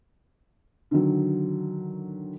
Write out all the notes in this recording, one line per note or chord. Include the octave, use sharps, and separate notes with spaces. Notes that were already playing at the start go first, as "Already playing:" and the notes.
D3 D#3 F#3